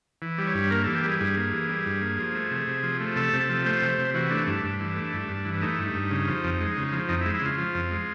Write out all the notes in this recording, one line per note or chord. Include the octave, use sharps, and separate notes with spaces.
E3
G3
C#5
G2
A#3 A#4
E3 A4
G4
G3 G#4
G2 G#4
A#3
E3
G3
G2
A#3
F3
A3
C3
C3
F3
A3
C3 A4
C3
A4
F3
A3 C5
C3
C3
E3 F#4
A3 D4
G2 D4
G2
E3
A3
G2
G2
E3
A3 D#4
G2
G2
C#3
F3
F2
G#3
C#3
F3
F2 D#4
E4
G#3
E4
C#3 F4
F3
F2
G#3